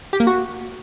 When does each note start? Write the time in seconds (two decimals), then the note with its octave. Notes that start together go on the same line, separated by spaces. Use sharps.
0.13 G4
0.20 A#3
0.27 F#4